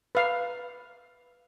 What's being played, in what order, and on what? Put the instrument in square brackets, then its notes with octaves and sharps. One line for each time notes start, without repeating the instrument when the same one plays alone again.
[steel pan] B4 F5